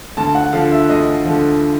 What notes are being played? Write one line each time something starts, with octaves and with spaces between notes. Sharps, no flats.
D2 A5
F#5
D3 F3 F5
E5
D2 D#5
D3 F3